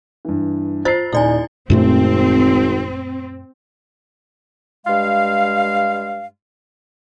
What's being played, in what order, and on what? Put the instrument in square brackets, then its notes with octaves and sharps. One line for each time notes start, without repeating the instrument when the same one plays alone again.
[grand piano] G2 E3
[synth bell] F4 C5 [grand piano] A6 C7
[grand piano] D#1 D#4 [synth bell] E4 D5 G#5
[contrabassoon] G#1 [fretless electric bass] F#2 A#2 A3 [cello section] C4
[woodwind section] G2 G#3 F5